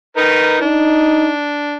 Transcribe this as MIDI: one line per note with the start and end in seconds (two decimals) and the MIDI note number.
0.17 0.59 63
0.17 0.59 70
0.17 0.59 71
0.61 1.77 62
0.61 1.31 63